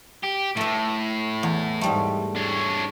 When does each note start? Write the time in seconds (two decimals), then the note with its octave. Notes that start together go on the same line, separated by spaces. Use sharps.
0.24 G4
0.57 A2 A3 E5
1.43 E2
1.81 G#2 G3 A3
2.36 D4 C#5